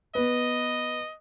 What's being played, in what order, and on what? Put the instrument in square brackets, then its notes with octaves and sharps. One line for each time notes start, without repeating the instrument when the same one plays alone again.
[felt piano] B3 B4 [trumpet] D#5